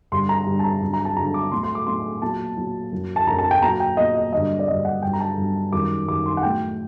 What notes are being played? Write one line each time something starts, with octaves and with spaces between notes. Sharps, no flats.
G2 D3 G3 C6
A#5
G2 D3 G3
A5
A#5
G2 D3 F#3
A#5
A5
G2 D3 F#3 A#5
D6
A2 F#3 C6
C6
D6
A2 F#3 C6
A#2 F#3 A5
A#2 F#3
F#2 F#3
A5
F#2 F#3 A#5
A5
G5
A#2 F#3 A#5
G5
A#2 F#3 D#5
D#5
G2 D3 F#3 D#5
D5
G2 D3 F#3 D#5
F#5
G2 F#3 G5
A#5
A5
G2 F#3
F#2 D#3 G3 D6
F#2 D#3 G3 D6
C6
F#5
A2 F#3 G5